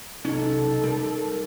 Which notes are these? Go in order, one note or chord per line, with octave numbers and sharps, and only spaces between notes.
B1 C3 C#4 D#4 A4
G3 A#4